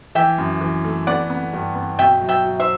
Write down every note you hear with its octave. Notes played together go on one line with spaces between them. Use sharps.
E3 E5 G5
F#2
E3
A3
B3 D5 F#5
B3
G2
B3
B2 E5 G5
F#3
E5 G5
F#3
C5 E5